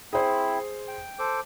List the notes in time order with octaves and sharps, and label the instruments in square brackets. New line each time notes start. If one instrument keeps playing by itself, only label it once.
[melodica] C4 E4 [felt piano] G#4 C5
[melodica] G5
A4 C5 D6